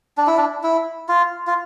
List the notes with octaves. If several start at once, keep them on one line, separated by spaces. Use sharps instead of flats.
D4
E4
D4
E4
F4
F4